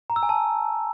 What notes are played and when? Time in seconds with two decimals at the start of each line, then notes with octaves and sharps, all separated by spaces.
0.10 A#5
0.16 E6
0.23 G#5
0.29 A5